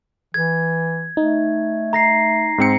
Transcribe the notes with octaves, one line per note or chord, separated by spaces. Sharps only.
E3 G#6
A3 D#4
A#5 A#6 C7
G#2 C4 C#7